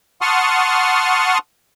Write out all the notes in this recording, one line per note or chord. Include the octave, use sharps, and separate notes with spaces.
F#5 A5 C6 C#6 D#6 F6